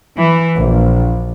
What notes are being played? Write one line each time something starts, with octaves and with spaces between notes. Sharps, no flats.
E3
A#1